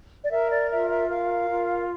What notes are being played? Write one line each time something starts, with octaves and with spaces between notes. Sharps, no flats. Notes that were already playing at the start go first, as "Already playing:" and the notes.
D5
A#4 E5
D5
F4 E5
E5
A#4 F5
F4